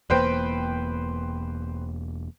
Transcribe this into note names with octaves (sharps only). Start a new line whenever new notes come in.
E1 E2 A#3 B4 C5 G5